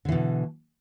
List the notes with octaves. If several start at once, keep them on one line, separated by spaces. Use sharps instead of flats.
B2 D3 E3